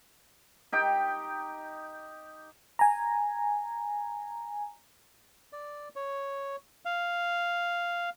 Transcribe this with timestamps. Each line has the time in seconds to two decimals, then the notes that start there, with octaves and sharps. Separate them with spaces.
0.72 D#4 G4 G5
2.79 G#5 A#5
5.52 D5
5.96 C#5
6.85 F5